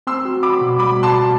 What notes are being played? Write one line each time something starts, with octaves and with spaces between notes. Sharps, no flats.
C4 C6 E6
F#4
F#4 B5 D6
B2
G3 B5 D6
B2
A5 C6
B2